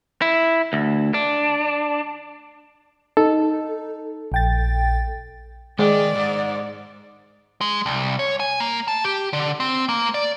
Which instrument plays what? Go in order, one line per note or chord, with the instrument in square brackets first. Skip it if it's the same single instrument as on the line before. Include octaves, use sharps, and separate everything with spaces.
[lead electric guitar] E4
D2
D4
[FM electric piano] D#4 [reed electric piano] A4
[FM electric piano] A#1 G5 A6
[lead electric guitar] D#3 G5 [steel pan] G#3 [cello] D5
[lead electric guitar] G#2
G#3
C2
C#5
G#5
A#3
A5
G4
D3
C4
A#3
D5